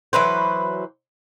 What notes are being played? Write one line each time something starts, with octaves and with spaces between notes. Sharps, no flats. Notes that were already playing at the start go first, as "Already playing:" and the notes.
E3 F#3 B4 C5